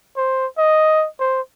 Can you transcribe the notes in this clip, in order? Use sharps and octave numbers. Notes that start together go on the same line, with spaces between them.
C5
D#5
C5